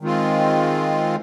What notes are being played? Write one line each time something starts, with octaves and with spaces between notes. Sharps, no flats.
D#3 G#3 C4 F4